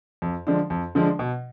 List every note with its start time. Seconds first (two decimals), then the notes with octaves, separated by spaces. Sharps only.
0.22 F2
0.47 D3 F3 G#3 D4
0.70 F2
0.95 D3 F3 G#3 D4
1.19 B2